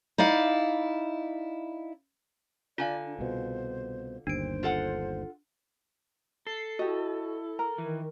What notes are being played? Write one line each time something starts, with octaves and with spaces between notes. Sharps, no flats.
D#4 E4 D5 F5
D3 F4 D5 F5 G#5
D4
C2 B2 C5
G1 D#2 D4 C5 D7
F4 A4 F#5
A4 C7
E4 F#4 G4 D#5
A#4 A#5
D#3 E3